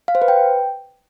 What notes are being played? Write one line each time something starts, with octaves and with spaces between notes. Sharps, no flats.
F5
C5
B4
G5